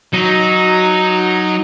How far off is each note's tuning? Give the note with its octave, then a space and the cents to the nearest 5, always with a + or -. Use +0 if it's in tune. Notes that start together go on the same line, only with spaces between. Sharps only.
F#3 +0 D#4 +0